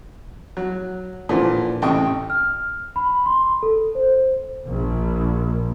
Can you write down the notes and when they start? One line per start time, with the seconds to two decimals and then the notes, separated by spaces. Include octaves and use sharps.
0.57 F#3
1.29 A#2 D3 E3 F3
1.82 A1 C3 G5 C#6 D#6
2.30 F6
2.96 B5
3.26 C6
3.63 A4
3.95 C5
4.68 A#1